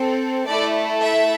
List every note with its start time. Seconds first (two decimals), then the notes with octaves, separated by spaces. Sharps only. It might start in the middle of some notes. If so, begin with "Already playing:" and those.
Already playing: C4 A4
0.46 A3 E4 A4 D5
1.02 E5